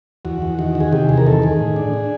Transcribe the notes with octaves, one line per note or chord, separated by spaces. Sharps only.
E2 F#4
E2
D#3 F#4
D#3
G#4
C3 G4
E2 G#4
A#4
D#3 A4
D#3 G#4
A2
D4
D4